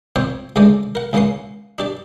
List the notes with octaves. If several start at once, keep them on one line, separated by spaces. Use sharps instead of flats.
F2 C4 C5 C#5 G5
C#2 D3 G#3 A3 C5 D5
A#4 F#5
C#2 E3 A#3 C#4 F#5 C6
D4 G4 D5